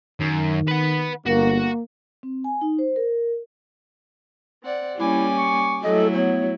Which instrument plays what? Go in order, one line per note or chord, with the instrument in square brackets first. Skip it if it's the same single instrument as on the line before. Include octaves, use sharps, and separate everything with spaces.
[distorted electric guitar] F#2 [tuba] D#3
[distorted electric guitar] B4 F#5
[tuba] G1 [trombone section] A#3 [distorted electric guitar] F#4
[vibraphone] C4
G#5
D#4
C5
A#4
[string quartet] C4 D5 F#5
[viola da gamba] G3 A#3 C#4 [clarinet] E4 [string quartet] G#5 D6
[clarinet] C#6
[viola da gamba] F#3 A3 E4 [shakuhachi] A4 [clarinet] D#5
[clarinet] B3 [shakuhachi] C#5